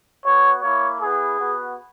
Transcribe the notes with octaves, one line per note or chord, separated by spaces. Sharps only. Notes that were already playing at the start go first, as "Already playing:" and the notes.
B3 F#4 C#5
A#3 E4 C#5
B3 E4 G#4
B3 F#4